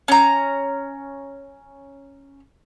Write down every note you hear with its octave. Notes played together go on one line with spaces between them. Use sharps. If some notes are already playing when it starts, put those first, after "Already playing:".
C#4 A#5